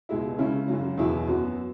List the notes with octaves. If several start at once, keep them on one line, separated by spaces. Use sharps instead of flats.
C#2 B2 G#3 E4
C#3 G#3 C#4 E4
F#2 C#3 F#3
E2 B2 F#3 E4 G#4
F#2 F#3 B3